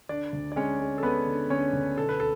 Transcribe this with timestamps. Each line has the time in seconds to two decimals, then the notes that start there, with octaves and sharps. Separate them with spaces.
0.09 D3 D4 D5
0.33 D2
0.52 D5
0.56 G#3 C#4 C#5
0.80 G#3
0.98 A4
1.03 G#3 B3 B4
1.27 D3
1.50 D3 C#4 C#5
1.73 D2
1.97 B1 A4
2.09 B4
2.20 A4